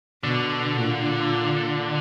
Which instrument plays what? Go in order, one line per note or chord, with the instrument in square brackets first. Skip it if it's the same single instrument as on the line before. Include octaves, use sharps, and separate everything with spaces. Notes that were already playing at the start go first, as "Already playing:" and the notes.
[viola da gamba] B2 [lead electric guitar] D3
[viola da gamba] A#2